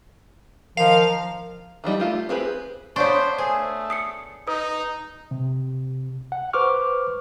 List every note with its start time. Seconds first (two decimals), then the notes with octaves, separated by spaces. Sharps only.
0.77 D#3 F3 A#4 F5
1.84 E3 F3 G3 D#4
2.00 A3 F4 G4
2.29 C4 G4 G#4 B4
2.96 B3 D4 C5 C#5 F5 C6 C#6
3.38 A3 G#4 C5
3.90 D#6 C7 C#7
4.47 D#4 B4 D#6
5.31 C3
6.32 F#5
6.53 B4 C5 C#6 D6 F6